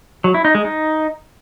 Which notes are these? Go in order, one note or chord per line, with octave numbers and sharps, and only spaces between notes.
F#3
E4
D#4
G#3
D#4